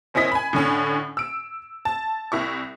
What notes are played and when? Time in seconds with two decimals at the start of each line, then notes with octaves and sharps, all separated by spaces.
0.14 F#1 C4 C#4 E4 D#5 B6
0.32 G#5 B5
0.53 A2 D3 C#4
1.17 E6 D7
1.85 A5
2.32 C2 E4 C#6